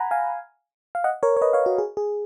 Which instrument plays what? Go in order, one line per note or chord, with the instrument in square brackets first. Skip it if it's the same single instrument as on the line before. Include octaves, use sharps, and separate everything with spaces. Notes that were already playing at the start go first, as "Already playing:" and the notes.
Already playing: [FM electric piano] F#5 G#5 A#5 B5
F5 G#5
F5
D#5 F#5
A#4 C#5
C#5
B4 D#5
C#5 F5
F#4
G#4
G#4